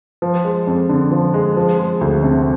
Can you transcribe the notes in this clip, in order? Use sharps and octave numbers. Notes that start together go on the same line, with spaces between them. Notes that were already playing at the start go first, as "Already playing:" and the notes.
F3
G#3
F2
D3
F3
G#3
F3
G#3
D2
C3